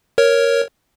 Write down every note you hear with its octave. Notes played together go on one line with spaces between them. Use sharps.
A#4 C#5